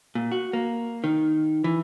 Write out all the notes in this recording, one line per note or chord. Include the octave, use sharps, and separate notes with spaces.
A#2
F#4
A#3
D#3
E3